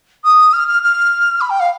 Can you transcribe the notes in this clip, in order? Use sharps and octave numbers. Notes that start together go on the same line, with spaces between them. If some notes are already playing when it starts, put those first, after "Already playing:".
D#6
F6
F6
F6
B5
G5
F5